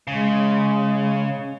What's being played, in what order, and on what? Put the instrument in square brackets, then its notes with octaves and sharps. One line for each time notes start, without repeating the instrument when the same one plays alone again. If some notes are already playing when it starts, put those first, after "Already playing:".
[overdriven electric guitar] C#3 [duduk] G#3